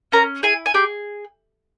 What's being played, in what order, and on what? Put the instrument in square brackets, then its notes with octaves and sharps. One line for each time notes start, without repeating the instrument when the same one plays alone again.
[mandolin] C#4 A#4 A#5
E4 G#4 G#5
G#5
G4 G#4 G5